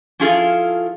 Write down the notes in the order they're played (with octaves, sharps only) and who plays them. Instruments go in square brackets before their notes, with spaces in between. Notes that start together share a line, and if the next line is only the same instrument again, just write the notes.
[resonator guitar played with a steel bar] F3 C#4 E4 F4 G#4 A4